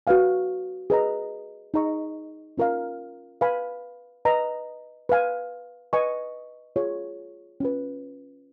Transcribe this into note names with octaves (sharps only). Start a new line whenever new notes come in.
F#4 B4 F5 G#5
G#4 B4 D#5 A#5
D#4 G#4 D#5 A#5 C#6
C#4 F4 A#4 F5
B4 F5 G#5 B5
B4 D#5 A#5
B4 F5 G#5
B4 D#5 G#5 C#6
F4 G#4 C#5
C#4 F4 B4